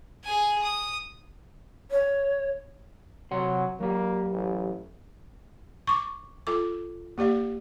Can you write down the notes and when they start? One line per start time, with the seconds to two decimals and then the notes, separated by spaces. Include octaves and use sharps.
0.24 G#4 G#5
0.63 D#6
1.91 C#5
3.31 C3 F#3 F#5 C6
3.80 F#3 A#3 G4
4.32 A1
5.87 C#6 D6
6.47 F4 A4 D6
7.18 A#3 G4 D5 F5